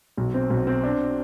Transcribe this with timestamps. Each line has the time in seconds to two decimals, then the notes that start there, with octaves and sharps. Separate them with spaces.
0.17 B1
0.34 C4
0.50 B1
0.67 C4
0.83 D4